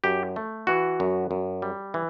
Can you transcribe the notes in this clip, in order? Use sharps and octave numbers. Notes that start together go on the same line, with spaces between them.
F#2 G4
A3
E3 F#4
F#2
F#2
G3
E3